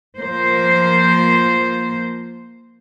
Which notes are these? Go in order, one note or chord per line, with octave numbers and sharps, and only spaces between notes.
F3 A#3 C5